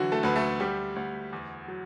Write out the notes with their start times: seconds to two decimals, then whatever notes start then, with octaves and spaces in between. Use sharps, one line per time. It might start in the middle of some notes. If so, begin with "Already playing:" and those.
Already playing: D3 E3 F#3 F#4
0.12 A3 A4
0.23 D2 B4
0.36 A3 A4
0.60 D2 G3 G4
0.96 D2
1.33 E2
1.68 F#3